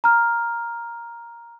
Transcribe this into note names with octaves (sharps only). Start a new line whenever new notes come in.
A#5 F6